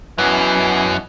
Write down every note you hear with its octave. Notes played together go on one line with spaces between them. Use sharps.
F#2 B2 E3 F#3